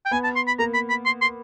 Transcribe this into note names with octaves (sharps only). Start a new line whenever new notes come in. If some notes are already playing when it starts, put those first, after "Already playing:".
G5
B3 G#5
A5
C6
B5
A#3 A#5
B5
B5
C6
C6